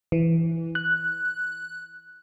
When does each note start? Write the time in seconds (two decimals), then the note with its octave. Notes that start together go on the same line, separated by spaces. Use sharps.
0.12 E3
0.75 F#6